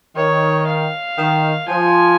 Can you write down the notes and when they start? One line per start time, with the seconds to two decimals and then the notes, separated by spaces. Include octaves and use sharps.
0.16 D#3 C#5
0.67 F5
1.18 D#3
1.68 F3 G#5